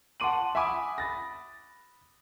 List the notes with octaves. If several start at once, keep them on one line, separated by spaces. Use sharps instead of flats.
F#5 A5 C6 D6 D#7 F#7
E5 F#5 G#5 B5 D6 D#6
B5 A6 A#6